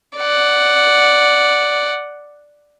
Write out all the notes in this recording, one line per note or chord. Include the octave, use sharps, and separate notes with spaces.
D5 F#5